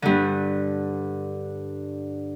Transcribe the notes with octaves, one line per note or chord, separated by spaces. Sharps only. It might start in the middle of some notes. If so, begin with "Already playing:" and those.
G2 D3